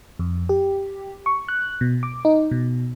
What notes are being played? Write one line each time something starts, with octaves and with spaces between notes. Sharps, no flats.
F2
G4
C#6
F#6
B2
D6
D#4
B2